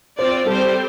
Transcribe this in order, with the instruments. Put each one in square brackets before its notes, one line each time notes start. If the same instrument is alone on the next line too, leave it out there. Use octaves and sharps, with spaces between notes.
[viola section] C4 F4 D5 [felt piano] C5
[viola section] G3 C4 G4 C5 [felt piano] A4